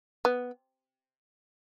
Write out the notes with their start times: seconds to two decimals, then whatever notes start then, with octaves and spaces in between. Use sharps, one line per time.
0.25 B3